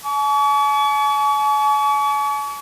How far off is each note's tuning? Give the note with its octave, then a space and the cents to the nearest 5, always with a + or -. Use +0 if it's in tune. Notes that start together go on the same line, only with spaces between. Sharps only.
G#5 +45 C#6 +45